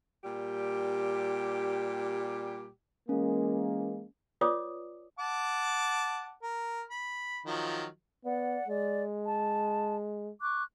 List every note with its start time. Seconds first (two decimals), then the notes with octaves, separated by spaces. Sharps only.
0.24 A#2 G3 G4
3.09 E3 G#3 A#3 C#4
4.41 F4 B4 C#5 D5 D6 D#6
5.19 F#5 A5 D6
6.42 A#4
6.90 B5
7.46 D#3 F3 F#3
8.25 B3 D5 F#5
8.68 G#3 D5
9.24 A5
10.41 C#6 D6 F#6